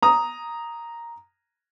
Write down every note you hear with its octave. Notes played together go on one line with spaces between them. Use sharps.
A#5 D#6